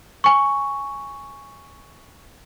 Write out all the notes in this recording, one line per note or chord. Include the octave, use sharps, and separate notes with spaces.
G#5 C#6